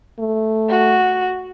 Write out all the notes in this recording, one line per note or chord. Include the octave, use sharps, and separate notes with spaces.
A3
F#4